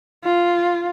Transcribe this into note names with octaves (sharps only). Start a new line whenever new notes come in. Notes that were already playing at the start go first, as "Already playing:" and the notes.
F4